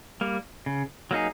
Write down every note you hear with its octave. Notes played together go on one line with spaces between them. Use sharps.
G3 A#3
C#3
F#3 A#3 D#4 G#4